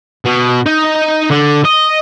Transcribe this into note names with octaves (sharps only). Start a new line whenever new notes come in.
B2
D#4
D3
D#5